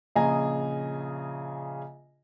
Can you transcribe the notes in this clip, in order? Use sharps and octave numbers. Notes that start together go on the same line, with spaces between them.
A#1 C#3 G#4 D#5 G#5 A#5